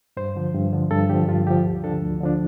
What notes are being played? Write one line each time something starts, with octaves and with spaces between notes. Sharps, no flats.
G2 C5
D3 F3
G2
D3 F3
G2 A4
D3 F3 G4
G2 F4
D3 F3 G4
D2
D3 F3 D4 A4
D2
D3 F3 D4